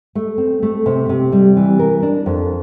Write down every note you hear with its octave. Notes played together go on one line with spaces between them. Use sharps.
A3
C4
A3
C3
C3
G3
E3
A#4
D4
F2